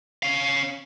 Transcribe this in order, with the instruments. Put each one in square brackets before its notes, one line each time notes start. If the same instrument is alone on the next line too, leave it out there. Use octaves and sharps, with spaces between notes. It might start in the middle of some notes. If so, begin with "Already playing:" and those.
[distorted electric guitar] C#4 F5